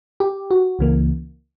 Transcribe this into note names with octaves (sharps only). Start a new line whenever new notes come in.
G4
F#4
C#2 C#3 E3 A#3